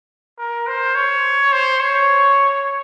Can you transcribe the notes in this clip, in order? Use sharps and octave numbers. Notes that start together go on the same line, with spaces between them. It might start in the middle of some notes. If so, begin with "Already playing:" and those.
A#4
C5
C#5
C5
C#5